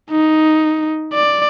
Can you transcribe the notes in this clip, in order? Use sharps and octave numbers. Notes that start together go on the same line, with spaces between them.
D#4
D5